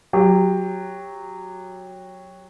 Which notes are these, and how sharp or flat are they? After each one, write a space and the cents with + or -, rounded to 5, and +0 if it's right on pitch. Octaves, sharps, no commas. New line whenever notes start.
F#3 -5 G4 +15